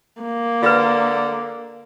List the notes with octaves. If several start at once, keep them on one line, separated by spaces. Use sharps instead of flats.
A#3
D3 F4 B4